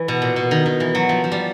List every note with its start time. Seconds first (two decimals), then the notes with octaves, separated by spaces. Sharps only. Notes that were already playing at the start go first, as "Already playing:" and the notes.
Already playing: E3
0.08 B2
0.22 A#2
0.36 B2
0.51 D#3
0.66 D#3
0.80 E3
0.95 F#3
1.09 F3
1.24 F3
1.32 G3